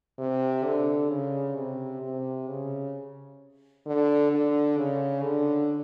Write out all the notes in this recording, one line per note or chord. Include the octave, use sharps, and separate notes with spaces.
C3
D3
C#3
C3
C3
C#3
D3
D3
C#3
D3